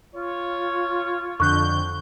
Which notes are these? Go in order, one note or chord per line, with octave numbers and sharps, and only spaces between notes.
F4 C#5
F2 D3 C#6 F#6 G6